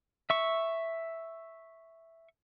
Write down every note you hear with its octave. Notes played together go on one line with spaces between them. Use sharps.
E5 C#6